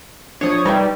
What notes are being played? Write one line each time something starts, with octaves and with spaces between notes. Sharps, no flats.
F3 D4 C#5 C#6 D#6
G3 D#4 B4 E5